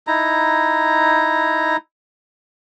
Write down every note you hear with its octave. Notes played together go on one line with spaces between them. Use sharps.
D#4 E4 A#5